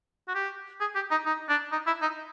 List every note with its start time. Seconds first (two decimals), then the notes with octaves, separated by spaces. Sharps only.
0.28 F#4
0.35 G4
0.80 G#4
0.95 G4
1.11 D#4
1.26 D#4
1.49 D4
1.72 D#4
1.87 E4
2.02 D#4